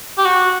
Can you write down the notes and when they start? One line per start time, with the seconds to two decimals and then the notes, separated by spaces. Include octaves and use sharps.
0.18 G4
0.25 F#4